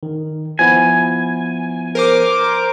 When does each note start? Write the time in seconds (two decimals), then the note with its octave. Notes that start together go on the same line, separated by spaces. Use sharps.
0.03 D#3
0.59 F3 B3 E4 G#5
1.95 A#4 C5 D6